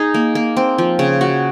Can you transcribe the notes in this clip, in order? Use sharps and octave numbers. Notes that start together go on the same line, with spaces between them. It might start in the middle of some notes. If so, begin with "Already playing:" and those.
Already playing: D#4 G#4
A#3
A#3
C4
F3
C#3
F#4